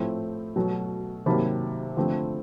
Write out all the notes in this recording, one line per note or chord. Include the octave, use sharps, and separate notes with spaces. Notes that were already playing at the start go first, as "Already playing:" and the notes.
Already playing: A2 F3 A3 C4
B2 F#3 A3
C3 D#3 F#3 A#3 A5 B5
D3 F3 A3 C4